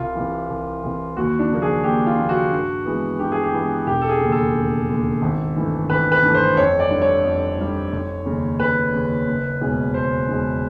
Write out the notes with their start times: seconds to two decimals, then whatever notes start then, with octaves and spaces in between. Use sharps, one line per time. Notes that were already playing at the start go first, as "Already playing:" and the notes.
Already playing: C2 F4
0.15 C3 E3
0.50 C2
0.83 C3 E3
1.17 D#2 F#4
1.39 D4
1.51 C#3 F3 A#3
1.62 G#4
1.84 D#2 G4
2.06 F4
2.18 C#3 F3 A#3
2.29 F#4
2.52 G2
2.86 E3 G#3 B3
3.19 G2 G4
3.32 G#4
3.43 G4
3.53 E3 G#3 B3
3.86 E1 G4
4.02 A4
4.09 G#4
4.20 D#2 C#3
4.32 A4
4.54 E1
4.88 D#2 C#3
5.22 G#1
5.56 G2 E3 A3
5.89 G#1 B4
6.12 B4
6.23 G2 E3 A3
6.34 C5
6.57 F2 C#5
6.79 D5
6.90 D3 G3
7.02 C#5
7.24 F2
7.58 D3 G3
7.92 F1
8.26 D#2 C#3
8.59 F1 B4
8.93 D#2 C#3
9.27 F#1
9.61 E2 B2 G#3 C#4
9.94 F#1 C5
10.28 E2 B2 G#3 C#4